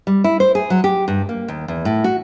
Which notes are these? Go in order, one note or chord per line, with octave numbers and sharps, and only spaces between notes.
G3
E4
C5
G#4
F#3
G4
G2
A#3
D#2
E2
A2
F#4